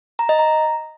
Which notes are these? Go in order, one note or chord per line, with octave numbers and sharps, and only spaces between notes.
A#5
D#5
A#5